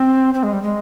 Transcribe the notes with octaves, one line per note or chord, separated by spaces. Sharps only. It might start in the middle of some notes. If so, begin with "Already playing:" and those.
Already playing: C4
C4
G#3
G3
G#3